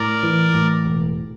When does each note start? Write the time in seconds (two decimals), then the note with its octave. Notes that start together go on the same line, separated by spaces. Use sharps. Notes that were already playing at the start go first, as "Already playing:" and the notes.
Already playing: A2 A#4 D5
0.23 E3
0.54 A2
0.85 E1